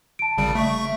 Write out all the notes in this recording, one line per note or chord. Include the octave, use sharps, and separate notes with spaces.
A5 D7
G#1 C#3 G3
A3 E5 C#6